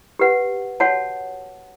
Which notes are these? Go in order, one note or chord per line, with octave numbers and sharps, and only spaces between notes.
G4 B4 F#5
F#4 C#5 F#5 A5